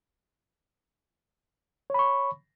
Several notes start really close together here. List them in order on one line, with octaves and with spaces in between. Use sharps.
C#5 B5 C#6